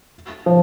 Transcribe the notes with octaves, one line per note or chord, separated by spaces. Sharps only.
F3